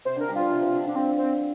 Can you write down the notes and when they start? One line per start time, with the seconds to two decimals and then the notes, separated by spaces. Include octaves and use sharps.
0.05 C3 C5
0.16 D3 A#4
0.28 G3
0.35 F3 F4
0.50 C3
0.61 C3
0.73 D3
0.84 D3 D4
0.96 F3 C4
1.18 C4